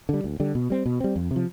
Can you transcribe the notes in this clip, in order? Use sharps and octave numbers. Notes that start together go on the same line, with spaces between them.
D3 G3
D2
D3 G3
B2
G3 C4
B2
G3 C4
F2
C3
F3